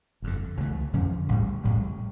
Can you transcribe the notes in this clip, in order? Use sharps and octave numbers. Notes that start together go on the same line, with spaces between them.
G1 F2 D3
C#2 C#3 E3 A3
F2 D3 F3 C#4
A1 A2 G3
A1 A2 G3